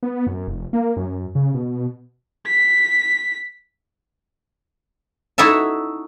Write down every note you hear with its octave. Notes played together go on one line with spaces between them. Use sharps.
B3
F#2
F1
A#3
F#2
C#3
B2
B6
D#4 E4 F#4 A4 E5 A5